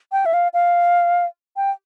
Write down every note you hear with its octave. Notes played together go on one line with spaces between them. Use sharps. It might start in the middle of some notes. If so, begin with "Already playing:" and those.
G5
E5
F5
F5
G5